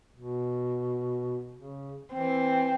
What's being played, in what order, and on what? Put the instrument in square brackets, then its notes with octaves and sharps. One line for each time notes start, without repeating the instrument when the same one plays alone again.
[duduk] B2
C#3
[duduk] E3 [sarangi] C4